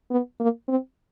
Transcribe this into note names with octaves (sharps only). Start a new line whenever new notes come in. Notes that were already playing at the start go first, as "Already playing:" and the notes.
B3
A#3
C4